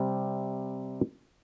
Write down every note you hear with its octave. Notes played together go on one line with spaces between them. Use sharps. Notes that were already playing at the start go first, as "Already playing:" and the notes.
Already playing: C3 G3